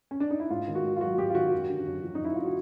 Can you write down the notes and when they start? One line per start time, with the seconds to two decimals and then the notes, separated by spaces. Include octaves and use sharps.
0.11 C#4
0.20 D4
0.31 D#4
0.40 E4
0.50 G#2 F4
0.68 D#3
0.75 F#4
0.84 G#2
0.96 F4
1.01 F#3 F#4
1.18 G#2 G4
1.30 F4
1.35 D#3 F#4
1.52 F#2
1.69 D3
1.86 F#2
2.04 F3
2.15 D#4
2.20 F#2 E4
2.35 D3 F4
2.45 F#4